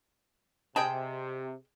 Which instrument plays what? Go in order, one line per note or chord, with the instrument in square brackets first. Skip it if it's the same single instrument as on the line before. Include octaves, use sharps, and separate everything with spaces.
[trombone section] C3 [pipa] G#4 G5 [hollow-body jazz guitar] D#5 A5